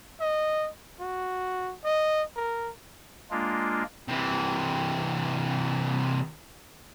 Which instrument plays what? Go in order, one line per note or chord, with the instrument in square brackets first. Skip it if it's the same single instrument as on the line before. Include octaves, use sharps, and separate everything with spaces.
[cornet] D#5
F#4
D#5
A#4
[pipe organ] G#3 A#3 D4 F4
[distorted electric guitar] C3 E3